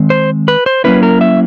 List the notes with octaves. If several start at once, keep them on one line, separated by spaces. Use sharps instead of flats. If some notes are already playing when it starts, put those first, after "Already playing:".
Already playing: D#3 G#3 C4
C5
B4
C5
F#3 A#3 C#4 E4 B4
A#4
E5